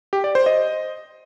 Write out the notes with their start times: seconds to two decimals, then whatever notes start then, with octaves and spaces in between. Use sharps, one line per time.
0.13 G4
0.24 D5
0.35 C5
0.46 D#5